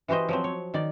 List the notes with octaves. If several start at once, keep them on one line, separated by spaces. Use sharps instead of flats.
E3 F#4 G4 C5 D#5
F3 F#3 C4
C#5
D#3 D5